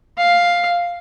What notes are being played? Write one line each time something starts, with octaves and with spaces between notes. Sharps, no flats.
F5